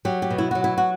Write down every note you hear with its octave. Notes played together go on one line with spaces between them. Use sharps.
F#3 G4
G4
B2
E4
F#3 F#4
E4
F#4